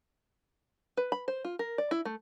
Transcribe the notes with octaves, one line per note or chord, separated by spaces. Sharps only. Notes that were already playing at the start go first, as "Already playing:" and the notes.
B4
B5
C5
F4
A#4
D5
E4
A3